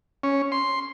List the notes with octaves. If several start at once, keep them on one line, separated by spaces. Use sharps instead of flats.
C#4
C6